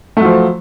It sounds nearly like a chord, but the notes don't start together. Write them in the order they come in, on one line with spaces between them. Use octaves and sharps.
A3 F#3 F3